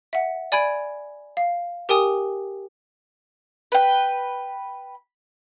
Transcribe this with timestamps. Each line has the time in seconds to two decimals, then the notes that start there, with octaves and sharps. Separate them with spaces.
0.13 E5 F#5
0.52 D5 G#5 B5 G#6 D7
1.37 F5
1.89 G4 A#4 G5 G#5 D#6
3.72 B4 G5